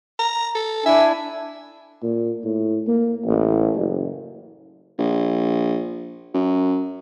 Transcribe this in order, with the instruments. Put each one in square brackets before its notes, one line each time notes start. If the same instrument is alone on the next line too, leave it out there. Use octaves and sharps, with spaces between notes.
[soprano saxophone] A#5
A4
[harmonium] D4 E4 G#5 [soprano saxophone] E5
[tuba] A#2
A2
A#3
A1
F#1
[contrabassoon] A#1
F#2